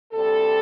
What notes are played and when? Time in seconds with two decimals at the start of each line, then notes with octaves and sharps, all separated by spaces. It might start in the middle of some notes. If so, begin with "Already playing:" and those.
0.13 D2 C3 G3 C4 A4